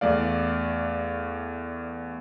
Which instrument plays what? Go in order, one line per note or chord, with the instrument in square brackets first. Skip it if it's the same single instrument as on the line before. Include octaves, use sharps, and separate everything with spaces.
[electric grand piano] E2 A3 D5 F5